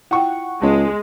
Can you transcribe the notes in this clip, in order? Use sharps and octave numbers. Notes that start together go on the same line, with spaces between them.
E4 F4 F#5 G5 C#6
C#2 G#3 B3 C#5